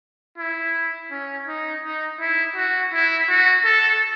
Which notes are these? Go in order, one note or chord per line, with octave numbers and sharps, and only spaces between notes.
E4
C#4
D#4
D#4
E4
F#4
E4
F#4
A4